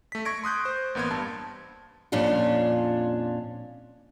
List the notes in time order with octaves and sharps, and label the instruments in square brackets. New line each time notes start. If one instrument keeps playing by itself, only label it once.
[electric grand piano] A3 B6
C#6 G#6 A#6 D7
C6 D#6 F#6 G6
C5
A1 A#3 B3 C6 G#6
G2 A5
[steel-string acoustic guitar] F2 A#2 C#4 D4 F4